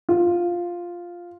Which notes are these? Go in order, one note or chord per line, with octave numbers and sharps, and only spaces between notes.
F4